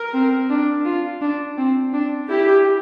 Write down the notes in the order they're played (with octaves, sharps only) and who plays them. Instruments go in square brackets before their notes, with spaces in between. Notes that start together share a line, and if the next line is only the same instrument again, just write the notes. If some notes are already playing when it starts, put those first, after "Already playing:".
Already playing: [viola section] A#4
[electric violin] C4
D4
F4
D4
C4
D4
[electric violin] E4 [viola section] G4